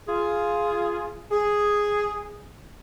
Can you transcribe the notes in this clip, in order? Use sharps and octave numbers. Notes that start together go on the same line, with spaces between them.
F4 G#4
G#4